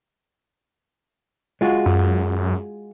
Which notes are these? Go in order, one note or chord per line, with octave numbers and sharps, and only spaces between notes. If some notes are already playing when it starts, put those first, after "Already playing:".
G#3 F4 F#4
F#2